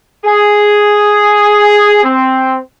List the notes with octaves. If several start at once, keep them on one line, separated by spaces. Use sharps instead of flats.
G#4
C4